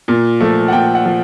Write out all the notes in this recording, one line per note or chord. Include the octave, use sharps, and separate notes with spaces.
A#2
F3 A3
F#5
A#2 G5
F#5
F3